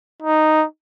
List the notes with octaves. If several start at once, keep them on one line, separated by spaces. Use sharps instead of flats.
D#4